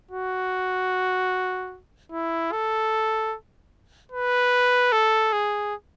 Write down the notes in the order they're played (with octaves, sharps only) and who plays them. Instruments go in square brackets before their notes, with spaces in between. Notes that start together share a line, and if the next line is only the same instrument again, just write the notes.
[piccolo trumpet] F#4
E4
A4
B4
A4
G#4